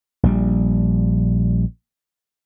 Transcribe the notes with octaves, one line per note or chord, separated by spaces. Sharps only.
A#1 G3